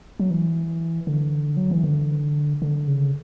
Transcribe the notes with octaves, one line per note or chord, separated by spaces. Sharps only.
F#3
E3
D3
F#3
E3
D3
D3
C#3